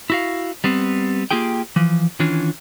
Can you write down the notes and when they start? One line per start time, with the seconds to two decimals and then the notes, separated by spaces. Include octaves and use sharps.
0.10 E4 F#4 F5
0.64 G3 B3 C4
1.31 A#3 F4 G4 G#4 G5
1.76 E3 F3
2.19 D#3 E3 C#4 D4 F4